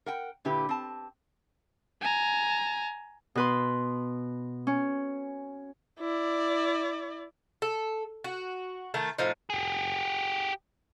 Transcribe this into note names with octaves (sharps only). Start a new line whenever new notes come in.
A#4 F#5 G5
A#2 D3 E4 G4 B4
C4 A5
G#5 A#5
B2 B4 C6
C#4
E4 D5
A4
F#4
D#3 A3 A4
A2 F3 D#4
G4 G#4